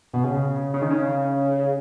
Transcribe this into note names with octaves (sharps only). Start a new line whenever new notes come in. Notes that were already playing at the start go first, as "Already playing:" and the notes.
B2
C#3
C#3
D#3
C#3